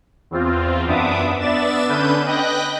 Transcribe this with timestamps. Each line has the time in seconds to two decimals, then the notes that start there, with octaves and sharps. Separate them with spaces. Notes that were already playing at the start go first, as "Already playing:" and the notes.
0.31 E2 C4 F4
0.87 F#2 B3 D4 E5 D6 D#6
1.40 B3 D4 D5 E5 A6 E7
1.89 D3 C#4 D4 B4 G6 D#7
2.25 B4 D#5 G5 F#6 G6 A#6